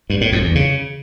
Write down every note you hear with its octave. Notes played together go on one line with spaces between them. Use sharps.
G2
A2
F2
E2
C#3